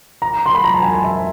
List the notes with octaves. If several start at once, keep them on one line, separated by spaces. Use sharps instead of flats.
A#5
C6
B5
A#5
A5
G#5
E5